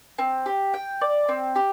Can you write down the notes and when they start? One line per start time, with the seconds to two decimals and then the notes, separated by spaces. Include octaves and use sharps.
0.19 C4
0.46 G4
0.74 G5
1.01 D5
1.29 C4
1.56 G4